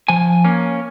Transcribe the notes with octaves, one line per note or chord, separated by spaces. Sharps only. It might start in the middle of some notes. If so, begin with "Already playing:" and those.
F3 G#5
A#3 C#4